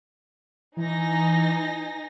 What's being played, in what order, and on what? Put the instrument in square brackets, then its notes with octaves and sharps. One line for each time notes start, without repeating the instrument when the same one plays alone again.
[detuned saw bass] E3 [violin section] D#4 G#5 A#6